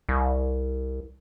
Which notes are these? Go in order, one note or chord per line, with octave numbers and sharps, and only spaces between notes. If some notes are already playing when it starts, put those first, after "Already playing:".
C2